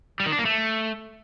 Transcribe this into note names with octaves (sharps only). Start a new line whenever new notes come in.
G3
D#3
D4
A#3
A3